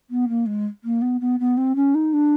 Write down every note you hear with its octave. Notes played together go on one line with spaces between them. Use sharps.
B3
A#3
G#3
A#3
B3
B3
B3
C4
C#4
D#4
D4